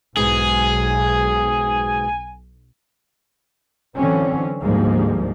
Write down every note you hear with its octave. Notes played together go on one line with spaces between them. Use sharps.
B1 G#2 B2 G#3 G#4 G#5
D3 E3 F#3 C4 C#4
D2 G#2 F3 G3 G#3 A#3